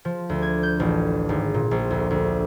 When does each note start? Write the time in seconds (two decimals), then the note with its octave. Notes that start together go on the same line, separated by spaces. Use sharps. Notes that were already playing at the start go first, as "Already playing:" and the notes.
0.05 F3
0.29 D2
0.42 G#6
0.63 G6
0.80 A1
1.29 G#1
1.54 A#2
1.71 A#1
1.90 D2
2.10 D2